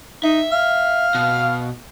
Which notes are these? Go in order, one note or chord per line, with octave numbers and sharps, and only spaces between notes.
D#4 E5
F5
B2